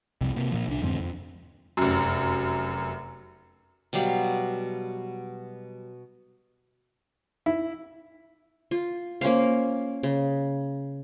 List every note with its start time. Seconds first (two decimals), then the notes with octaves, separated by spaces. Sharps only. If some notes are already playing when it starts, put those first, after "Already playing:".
0.21 C2 F2 C3
0.36 C3 A#3
0.51 A#2 F3
0.68 C2 D4
0.82 F2 G#2 D3 C4
1.00 F2
1.77 F1 F#2
3.93 B2 F#3 G3 F5
7.46 E4
8.71 F4
9.21 A#3 C#4 C5 F5
10.03 C#3